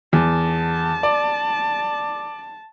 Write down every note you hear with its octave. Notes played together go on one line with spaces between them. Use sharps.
E2 A5
D5